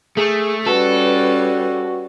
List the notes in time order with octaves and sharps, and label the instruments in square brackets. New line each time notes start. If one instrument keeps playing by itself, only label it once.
[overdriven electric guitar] A3 [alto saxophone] G#4
[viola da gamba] G3 C#4 [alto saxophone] F#4 [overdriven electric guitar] A4 [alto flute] B4